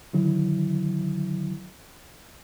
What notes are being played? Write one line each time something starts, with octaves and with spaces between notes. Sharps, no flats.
D3 D#3 F#3 E4